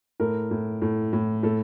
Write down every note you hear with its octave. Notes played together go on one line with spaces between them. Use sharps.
A2 A#4
A2
A2
A2
A2 A4